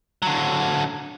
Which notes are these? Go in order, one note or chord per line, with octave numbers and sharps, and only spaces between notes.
D3 F#3